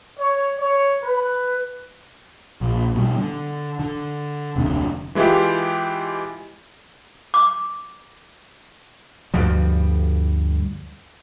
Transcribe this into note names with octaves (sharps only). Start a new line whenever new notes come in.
C#5
C#5
B4
A#1
B2 G3
D3
D3
F1 D2 C3 D4
E3 G#3 E4 F4 G4
D6
D2 G2 F3 G3